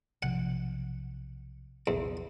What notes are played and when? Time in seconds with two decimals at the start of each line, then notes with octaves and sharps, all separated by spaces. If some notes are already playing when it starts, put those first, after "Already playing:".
0.23 B1 C3 F3 F#5
1.87 E1 A#1 E2 C#4